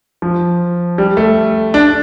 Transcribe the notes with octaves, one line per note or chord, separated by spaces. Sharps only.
F3
G3
A3
D4